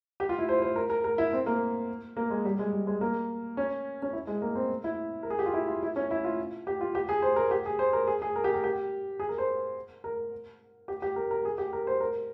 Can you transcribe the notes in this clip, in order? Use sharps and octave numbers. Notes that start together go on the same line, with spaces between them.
G4
F4
E4
C5
C5
A#4
A#4
A#4
E4
C4
A#3
A#3
G#3
G3
G#3
G3
G#3
A#3
C#4
C#4
E4
G#3
A#3
C4
E4
A#4
G#4
G4
F4
E4
F4
E4
C#4
E4
F4
G4
F4
G4
G#4
C5
A#4
G4
G#4
C5
A#4
G#4
G#4
A#4
G4
A#4
G4
G#4
A#4
C5
A#4
G4
G4
A#4
A#4
G#4
G4
A#4
C5
A#4